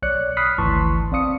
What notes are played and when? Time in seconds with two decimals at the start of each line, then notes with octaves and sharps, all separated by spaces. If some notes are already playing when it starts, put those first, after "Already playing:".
0.02 B1 C#5 D5 F#6 C#7
0.37 B5 D#6 F6 F#6 B6 C7
0.58 G#1 D2 E3 A5 C6 C#6
1.11 B1 C4 D5 F5 D#6 C#7